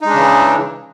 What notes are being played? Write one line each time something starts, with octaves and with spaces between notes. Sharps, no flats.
C#3 E3 G#3 D4 D#4